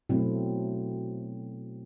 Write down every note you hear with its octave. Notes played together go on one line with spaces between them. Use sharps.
B2 F#3 A3 C4 E4